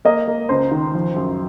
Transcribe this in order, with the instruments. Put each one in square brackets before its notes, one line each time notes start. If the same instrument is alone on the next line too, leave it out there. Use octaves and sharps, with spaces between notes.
[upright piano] A#3 D#5
A#3
C#2 C5
D#3
F3
F#2